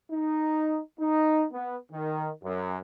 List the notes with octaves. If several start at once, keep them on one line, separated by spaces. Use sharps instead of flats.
D#4
D#4
B3
D#3
F#2